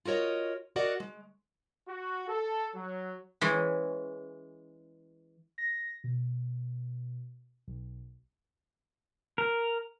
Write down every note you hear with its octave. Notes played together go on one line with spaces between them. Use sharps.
F4 F#4 A#4 C#5 D#5
F#4 A#4 D5 D#5 F#5
G#3
F#4
A4
F#3
E3 G#3 C#4
A#6
B2
B1
A#4